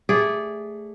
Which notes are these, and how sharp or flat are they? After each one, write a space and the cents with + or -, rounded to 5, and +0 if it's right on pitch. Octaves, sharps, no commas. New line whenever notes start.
A3 +0 G#4 -15 D5 -15